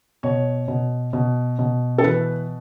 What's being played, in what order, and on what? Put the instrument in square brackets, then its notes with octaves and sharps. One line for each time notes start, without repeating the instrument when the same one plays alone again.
[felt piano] B2 C#5
B2
B2
B2
A4
E3 B4